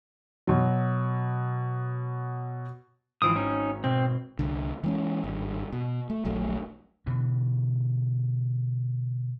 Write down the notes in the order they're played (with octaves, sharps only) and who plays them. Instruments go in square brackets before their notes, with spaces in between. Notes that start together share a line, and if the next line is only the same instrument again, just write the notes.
[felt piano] B2 F#3
[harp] G#1 E6 D7 [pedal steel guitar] E3 F3 D#6
[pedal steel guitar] C#4 D#4
[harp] B2 [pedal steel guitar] C4
[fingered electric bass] C2 D3
E3 G#3 C#4
G#1 G2
B2
A3
D#1 A#1 F#3 A3
[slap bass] B2 D3 E3